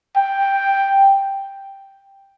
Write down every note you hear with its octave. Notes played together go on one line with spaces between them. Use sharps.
G5